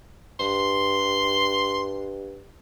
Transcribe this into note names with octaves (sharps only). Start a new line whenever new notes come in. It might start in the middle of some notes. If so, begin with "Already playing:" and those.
G2 C6